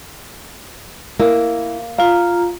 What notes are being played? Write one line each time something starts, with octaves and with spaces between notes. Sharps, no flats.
A#3 E4
F4 F5 A#5